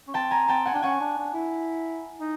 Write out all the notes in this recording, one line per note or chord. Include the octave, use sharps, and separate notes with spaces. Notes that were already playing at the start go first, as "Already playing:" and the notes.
C#4
C4 G5 A5
G#5 A#5
C4 G5 A5
F#5 G#5
D4 G5
C#4 F#5 G#5
D4
D4
E4
D#4